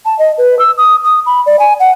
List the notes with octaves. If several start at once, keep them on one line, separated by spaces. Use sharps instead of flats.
A5
D#5
B4
E6
D#6
D#6
B5
D5
G#5
F#5